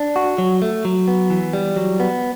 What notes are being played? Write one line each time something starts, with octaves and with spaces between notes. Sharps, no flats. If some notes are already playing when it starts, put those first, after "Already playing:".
Already playing: D4
F#4
F#3
A3
F#3
B3
E3
G3
F#3
B3